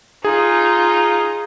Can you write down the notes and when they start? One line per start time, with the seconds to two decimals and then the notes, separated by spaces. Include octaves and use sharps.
0.25 D#4 F4 G#4